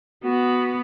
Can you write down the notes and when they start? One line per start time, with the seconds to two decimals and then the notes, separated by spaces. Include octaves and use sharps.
0.24 B3 F#4